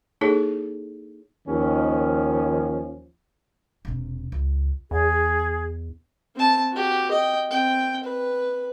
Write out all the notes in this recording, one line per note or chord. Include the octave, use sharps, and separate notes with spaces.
A#3 D#4 E4 G#4 A4 C#5
D#2 D#3 F3 C#4
E1 C3
C#2
E2 G#4
C4 A5
F#4 G4
D#5 G5
C4 G5
B4